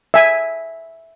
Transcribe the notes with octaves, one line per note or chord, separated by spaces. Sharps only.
E5 G#5